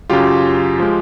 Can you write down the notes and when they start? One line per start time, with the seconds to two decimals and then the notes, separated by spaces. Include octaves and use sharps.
0.10 F#2 C#3 F#3 F4 G4
0.80 F3 G#3